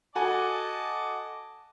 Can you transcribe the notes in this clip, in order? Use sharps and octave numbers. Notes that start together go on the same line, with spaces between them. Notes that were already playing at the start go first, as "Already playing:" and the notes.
F#4 A4 D#5 G#5 A5 D6